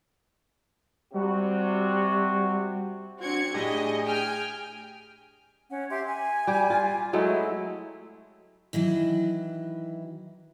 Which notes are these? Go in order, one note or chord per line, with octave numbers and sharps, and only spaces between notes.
C3 G3 F#4
C4 D4 F#4 G#6 C#7
A2 D4 G4 G#4 D#5
G5 G#5 F6
C#4 F#5
G4 E5 C6
G#5
G3 G4
F4
F#3 G#3 A3 E4
D#3 E3 F#3 E4